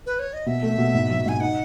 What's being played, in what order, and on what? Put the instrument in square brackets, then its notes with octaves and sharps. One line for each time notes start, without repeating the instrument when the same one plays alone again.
[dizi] B4
C#5
D#5
[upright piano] B2 [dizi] E5
[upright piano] A3
B2
G#2
F#3
[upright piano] G#2 [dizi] G#5
[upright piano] D#4 [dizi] F#5